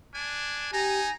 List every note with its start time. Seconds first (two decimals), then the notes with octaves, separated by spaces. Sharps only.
0.14 D4 G#5
0.73 D#4 G4 G#5 A#5